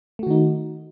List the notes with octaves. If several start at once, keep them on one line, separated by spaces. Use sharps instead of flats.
D#3 A3 D#4 F#4